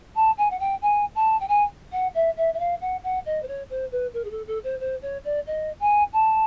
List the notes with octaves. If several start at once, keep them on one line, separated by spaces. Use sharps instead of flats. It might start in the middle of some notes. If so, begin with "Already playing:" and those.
A5
G#5
F#5
G5
G#5
A5
G5
G#5
F#5
E5
E5
E5
F5
F#5
F#5
D#5
C5
C#5
C5
B4
A#4
G#4
A4
A4
C5
C5
C#5
D5
D#5
G#5
A5